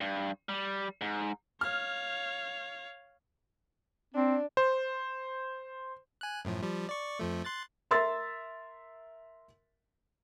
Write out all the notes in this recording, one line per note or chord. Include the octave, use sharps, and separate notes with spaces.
G2
G3
G#2
C#5 F5 F6
C4 D4
C5
G#5 F#6
F#2 A2 F3
F3 G3
D5 C#6
F2 F3 A3
C6 F#6 A6
A#4 E5 C6 E6 A6